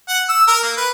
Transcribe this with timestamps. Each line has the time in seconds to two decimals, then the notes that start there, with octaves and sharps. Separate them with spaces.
0.09 F#5
0.29 E6
0.48 A#4
0.63 A#3
0.77 B4